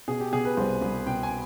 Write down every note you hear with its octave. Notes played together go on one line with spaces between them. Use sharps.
B2 G#4
G4
B2 G#4
B4
C2 C5
C2
B2 G5
G#5